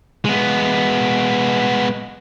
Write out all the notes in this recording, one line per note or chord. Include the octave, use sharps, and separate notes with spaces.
G#3 B3